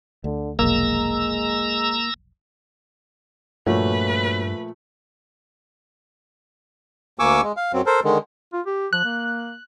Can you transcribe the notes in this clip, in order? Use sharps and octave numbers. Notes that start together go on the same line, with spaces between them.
D2 D3
F1 B1 G#3 A#3 A#5 E6
G2 A#2 F3 A3 A#3 F#4 B4 C#5
D2 A#3 G#5 C#6 D6 E6
G#3
F5
F#2 F#3 C4
A4 A#4 C5
D3 D#3 G#3
F4
G4
F3 F#6
A#3